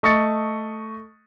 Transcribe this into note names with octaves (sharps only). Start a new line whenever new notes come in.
A3 D#5 C#6 D#6 A6 C#7